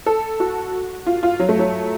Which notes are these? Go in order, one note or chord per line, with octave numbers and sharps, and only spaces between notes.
A4
F#4
F4
F4
F#3
A3
F#3